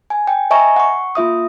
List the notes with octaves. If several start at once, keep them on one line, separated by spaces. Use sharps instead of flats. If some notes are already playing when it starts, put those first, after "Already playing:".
G#5
G5
D#5 E5 G#5 A#5 C#6
F#5 C#6
A#3 F4 E5 D#6